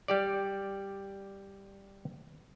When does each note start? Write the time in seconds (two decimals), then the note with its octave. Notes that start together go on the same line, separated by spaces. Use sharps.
0.08 G3 G4 D5